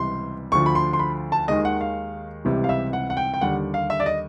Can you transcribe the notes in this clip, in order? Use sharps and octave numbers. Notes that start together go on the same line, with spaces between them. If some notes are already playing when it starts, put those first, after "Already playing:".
Already playing: C#2 C3 E3 G3 C6
D2 D3 F3 C#6
B5
C6
C6
B5
A5
D#2 D#3 G#3 D#5
F#5
F5
C#2 C3 E3 G3
F5
E5
F#5
F#5
G5
G5
D#2 D3 G3 F#5
F5
E5
D5
D#5